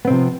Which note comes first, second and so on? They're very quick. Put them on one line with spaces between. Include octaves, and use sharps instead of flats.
B3 C4 C3 F3